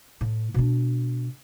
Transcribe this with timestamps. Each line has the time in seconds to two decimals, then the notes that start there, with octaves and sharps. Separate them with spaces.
0.21 A2
0.54 B2 D4